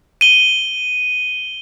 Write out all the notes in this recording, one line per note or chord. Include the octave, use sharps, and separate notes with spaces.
D#7 G7